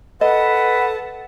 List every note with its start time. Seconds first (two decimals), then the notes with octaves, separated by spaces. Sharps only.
0.21 A4 B4 D#5 F#5